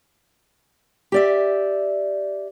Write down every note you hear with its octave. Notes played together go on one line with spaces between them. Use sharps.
G4 D5 E5